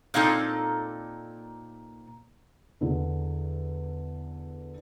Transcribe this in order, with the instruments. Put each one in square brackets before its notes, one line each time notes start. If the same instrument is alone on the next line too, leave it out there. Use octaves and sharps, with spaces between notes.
[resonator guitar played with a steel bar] A#2 A#3 C4 D#4 A4
[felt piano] E2 D3